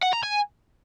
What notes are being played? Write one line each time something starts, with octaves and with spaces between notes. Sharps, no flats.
F#5
A#5
G#5